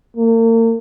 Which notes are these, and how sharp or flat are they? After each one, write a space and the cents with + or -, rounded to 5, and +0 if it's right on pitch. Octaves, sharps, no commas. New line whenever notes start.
A#3 -40